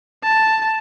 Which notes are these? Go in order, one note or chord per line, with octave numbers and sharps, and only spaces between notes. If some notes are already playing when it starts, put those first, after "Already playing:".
A5